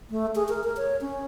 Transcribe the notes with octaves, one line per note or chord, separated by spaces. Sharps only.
A3
G#4
A#4
A#4
C#5
C#4